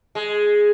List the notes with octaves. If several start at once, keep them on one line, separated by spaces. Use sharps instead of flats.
G#3